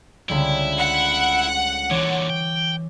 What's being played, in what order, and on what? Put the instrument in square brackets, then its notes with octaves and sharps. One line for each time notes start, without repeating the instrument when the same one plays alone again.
[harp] C#2 D3 G3 [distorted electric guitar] E4
[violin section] F#5
[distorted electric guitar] A#2 D3 [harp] E3 C#5 D6
[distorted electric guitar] G5